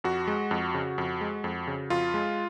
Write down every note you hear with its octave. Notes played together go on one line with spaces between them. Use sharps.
F2 F#4
G#3
F2
C#3
F2
G#3
F2
C#3
F2 F4
G#3